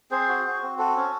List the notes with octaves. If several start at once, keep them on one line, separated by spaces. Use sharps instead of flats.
C4 G#4 C5
F#4
F#4
C4
F#4 A4
C#4